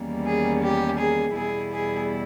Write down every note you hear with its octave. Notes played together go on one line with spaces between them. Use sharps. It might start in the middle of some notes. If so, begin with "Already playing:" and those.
Already playing: E2 D#3 G3 A#3 C#4
G#4
G4
G#4
E2 B2 G3 B3 E4 G#4
G#4